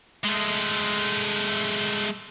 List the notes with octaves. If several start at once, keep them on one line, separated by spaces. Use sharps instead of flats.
G#3 A3